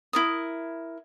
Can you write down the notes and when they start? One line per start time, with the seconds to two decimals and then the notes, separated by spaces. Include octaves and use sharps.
0.13 E4 A#4 D#6